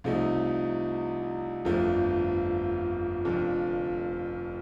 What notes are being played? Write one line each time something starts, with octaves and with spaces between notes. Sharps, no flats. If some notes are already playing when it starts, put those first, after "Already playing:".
C2 C3 F3 A3 D#4
G1 F2 D3 F3 A3
F1 F2 D3 F3